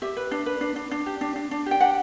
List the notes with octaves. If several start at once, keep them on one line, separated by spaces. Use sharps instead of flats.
G4 E5
B4
D4
B4
D4
D4
D4
G4
D4
D4
D4
G4 G5
D4 F#5